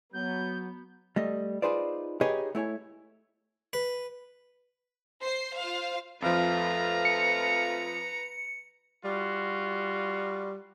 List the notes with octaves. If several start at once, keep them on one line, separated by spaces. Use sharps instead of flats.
F#3 B3 G6
G3 A3 D#5
D#4 F4 G#4 B4 C5 D5
D#4 G4 G#4 B4 C#5 D#5
A3 E4 C#5 G#5
B4
C5 C7
F4 C5 F5
F2 F3 A3 F4 B4 A#5
C#7
G3 F4 F#4